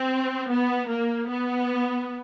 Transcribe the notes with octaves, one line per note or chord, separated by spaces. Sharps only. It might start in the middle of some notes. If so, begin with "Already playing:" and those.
Already playing: C4
B3
A#3
B3